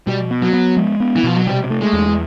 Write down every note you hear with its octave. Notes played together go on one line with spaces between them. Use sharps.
B2 G3
B3
F#3
B3
G#3
B3
E3
B2 F3
F#3
C3 G3
A3
G#3
E2